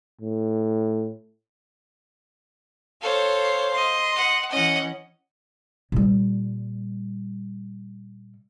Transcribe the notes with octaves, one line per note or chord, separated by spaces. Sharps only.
A2
A4 C5 C#5 F5
D#5 C6
F#5
E3 C#4 D#5 F#5
A#2 G3